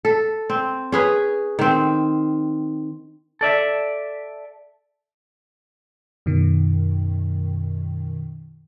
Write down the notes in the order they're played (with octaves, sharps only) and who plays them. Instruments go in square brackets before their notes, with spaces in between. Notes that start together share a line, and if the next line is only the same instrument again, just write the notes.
[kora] A4
C4
C#4 G#4 B4
D#3 C4
[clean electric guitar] A4 D5 E5
[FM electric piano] F#2 B2 D#3